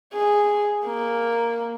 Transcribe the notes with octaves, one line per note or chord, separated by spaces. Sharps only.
G#4
A#3